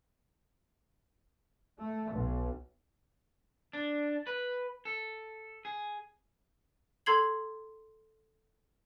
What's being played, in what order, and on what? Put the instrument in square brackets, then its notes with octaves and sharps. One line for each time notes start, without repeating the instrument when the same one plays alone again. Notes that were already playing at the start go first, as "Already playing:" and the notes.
[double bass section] A3
B1
[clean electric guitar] D4
B4
A4
G#4
[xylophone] A4 A#5 C6 G#6 C7 F#7